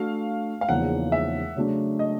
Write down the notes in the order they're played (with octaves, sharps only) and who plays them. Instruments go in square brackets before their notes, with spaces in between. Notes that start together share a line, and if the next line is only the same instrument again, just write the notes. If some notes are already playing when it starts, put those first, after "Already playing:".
Already playing: [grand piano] A3 D4 F#4 A4 [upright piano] F5
[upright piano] F5
[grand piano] E2 C#3 F3 A#3 D#4 [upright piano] F#5
[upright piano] E5
[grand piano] C#3 F#3 A3 D4
[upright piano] D#5